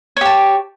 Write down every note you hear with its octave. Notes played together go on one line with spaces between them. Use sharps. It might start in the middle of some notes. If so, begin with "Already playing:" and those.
G4 C#5 A5